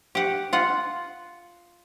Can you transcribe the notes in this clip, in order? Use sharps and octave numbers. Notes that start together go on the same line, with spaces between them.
G4 F#5
F4 F#5